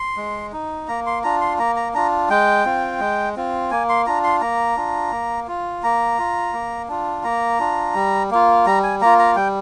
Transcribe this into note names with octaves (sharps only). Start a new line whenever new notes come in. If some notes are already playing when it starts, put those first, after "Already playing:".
Already playing: C6
G#3
D#4
A#3 A#5
C6
D4 F4 A#5
C6
A#3 A#5
A#5
D4 F4 A#5
G#3 G5
C4 F4
G#3
C4 F4
A#3 G#5
C6
D4 F4 A#5
C6
A#3 A#5
D4 F4
A#3
F4
A#3 A#5
F4
A#3
D4 F4
A#3 A#5
D4 F4
G3
A#3 F4
G3 A#5
G#5
A#3 F4 A#5
A#5
G3 G5